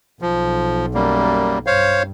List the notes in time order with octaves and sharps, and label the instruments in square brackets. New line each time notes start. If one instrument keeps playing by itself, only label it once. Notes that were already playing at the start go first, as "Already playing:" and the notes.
[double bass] B1 [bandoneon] F3
[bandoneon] F#2 G3 A#3
[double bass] G2 [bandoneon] C5 C#5 F5